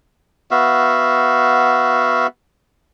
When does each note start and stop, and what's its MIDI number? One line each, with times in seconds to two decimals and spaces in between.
0.51 2.27 59
0.51 2.27 66
0.51 2.27 76
0.51 2.27 77